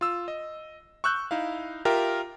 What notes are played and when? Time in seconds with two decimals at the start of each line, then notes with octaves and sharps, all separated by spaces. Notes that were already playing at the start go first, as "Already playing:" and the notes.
0.01 F4 E6
0.28 D#5
1.04 C#6 E6 F#6 G6
1.31 D#4 E4 F5
1.85 F4 G4 A#4 E5 G5